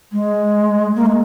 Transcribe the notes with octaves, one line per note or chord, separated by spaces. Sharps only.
G#3
A#3
G#3